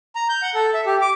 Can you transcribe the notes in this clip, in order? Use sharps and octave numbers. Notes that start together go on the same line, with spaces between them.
A#5
G6
F#5
A4
E5
G4
D6